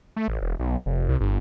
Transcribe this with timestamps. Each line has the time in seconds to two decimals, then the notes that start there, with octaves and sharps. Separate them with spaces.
0.16 A3
0.28 A1
0.42 E1
0.59 B1
0.86 F1
1.09 C2
1.20 G1